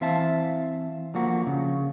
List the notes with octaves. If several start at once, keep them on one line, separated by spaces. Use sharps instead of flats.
E3 C4 E5 F5 A5
D3 F3 A#3 F#4
C#3